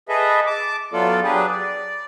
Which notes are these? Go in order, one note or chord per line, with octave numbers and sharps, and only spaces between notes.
G#4 A4 B4 D#5 E5
A5 D6
F#3 A3 B3 F4 A4 D5
F#3 D4 G4 G#4 B4
D5